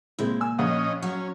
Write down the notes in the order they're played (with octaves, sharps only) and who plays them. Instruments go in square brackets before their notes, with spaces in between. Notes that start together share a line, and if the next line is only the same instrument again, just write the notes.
[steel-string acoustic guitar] A#2 [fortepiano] G#3 C4 E4
[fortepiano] G#5 E6
[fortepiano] A#1 F#5 [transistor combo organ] C#4 D#5
[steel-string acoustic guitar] F#3 F#4 [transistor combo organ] C#4